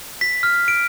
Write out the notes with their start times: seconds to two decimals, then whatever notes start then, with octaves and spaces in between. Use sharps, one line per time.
0.21 B6
0.43 F6
0.68 D7